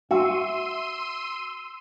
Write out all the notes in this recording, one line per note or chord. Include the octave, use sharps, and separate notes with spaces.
F#4 E5 C6 E6 D#7